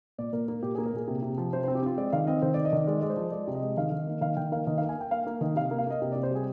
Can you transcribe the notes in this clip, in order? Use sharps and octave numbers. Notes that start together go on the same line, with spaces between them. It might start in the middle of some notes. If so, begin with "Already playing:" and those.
A#2 D5
A#2 A#4
A#3
A#2 G4
G#4
A#3
A#4
A#2 G#4
C3
C3
F3
C3 C5
C5
C4
G4
C4 F4
G#3 D5
D#3 F5
C4 D#5
D#3 C5
D5
D#3
D#5
D#3 D5
G#3 D5
G#3 D5
C5
F3
G#3 D5
C3
D#5
G#3
D#3 F5
D#3
A#3
D#3 F5
D#3 G5
A#3 F5
D#3 D#5
F5
A#3
G#5
A#3 G5
A#3 F5
A#3
D#3 D#5
C3 F5
A#3
F5
A#3 D#5
C3
D5
C3
C5
G3 G#4